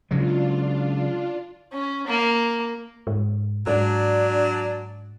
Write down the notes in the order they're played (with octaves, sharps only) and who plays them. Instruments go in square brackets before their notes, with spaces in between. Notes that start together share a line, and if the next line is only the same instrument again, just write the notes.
[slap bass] C#3 F#3 G#3 [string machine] D4 F4
[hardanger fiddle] C#4
A#3
[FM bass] G#2
[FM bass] G#2 [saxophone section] F#3 D4